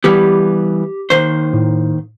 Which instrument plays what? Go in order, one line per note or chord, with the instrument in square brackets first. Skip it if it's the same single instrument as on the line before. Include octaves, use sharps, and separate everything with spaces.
[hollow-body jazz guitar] E3 G3 B3 [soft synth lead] G4
[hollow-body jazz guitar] D#2 D#3 C5
[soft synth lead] A2